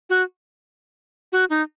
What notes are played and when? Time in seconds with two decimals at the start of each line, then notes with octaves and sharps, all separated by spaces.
0.10 F#4
1.32 F#4
1.50 D#4